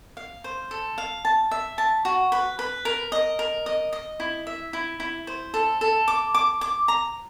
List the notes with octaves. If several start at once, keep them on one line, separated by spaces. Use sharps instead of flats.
F5
C5
A4
F5
A5
E5
A5
F#4
B4
B4
A#4
D#5
A#4
D#5
D#5
E4
E5
E4
E4
C5
A4
A4
D6
D6
D6
A#5